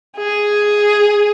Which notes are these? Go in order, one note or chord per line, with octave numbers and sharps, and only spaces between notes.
G#4